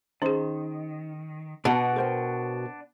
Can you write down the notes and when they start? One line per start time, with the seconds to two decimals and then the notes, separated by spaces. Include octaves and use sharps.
0.22 D#3 C#4 D#4 G#4 C5
1.65 B2 D4 F#4 B4 D#5 F#5 A5 A#5
1.96 A#4 C5 G5